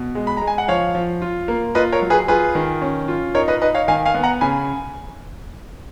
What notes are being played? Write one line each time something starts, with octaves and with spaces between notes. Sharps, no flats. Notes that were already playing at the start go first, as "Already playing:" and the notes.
Already playing: B2
G#3
B5
G#3 A#5
G#5
F#5
F3 C#5 F5
F3
F4
A#3
F4 B4 D#5
A#4 C#5
F#3
G#4 B4
F4 G#4 B4
D#3
C#4
F4
D#4 A#4 C#5
B4 D#5
D#4 B4 D#5
C#5 F5
D#3 F5 G#5
F5 G#5
B3
F#5 A#5
C#3 G#5 B5